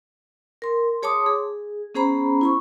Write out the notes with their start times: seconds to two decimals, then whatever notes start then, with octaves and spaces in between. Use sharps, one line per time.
0.62 A#4 C6
1.03 G#4 C#5 A5 C6 D6 D#6
1.26 G#4
1.95 B3 C#4 G#4 C5 A#5 B5
2.41 E4 B5 C#6